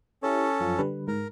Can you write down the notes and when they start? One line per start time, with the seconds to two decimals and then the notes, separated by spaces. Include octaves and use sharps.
0.23 C#4 E4 G4 A4 C#5
0.60 F#2 F3 F4
0.78 D3 G3 B4
1.08 G#2 A#4